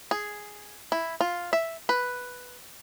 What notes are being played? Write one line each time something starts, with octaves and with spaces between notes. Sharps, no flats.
G#4
E4
F4
E5
B4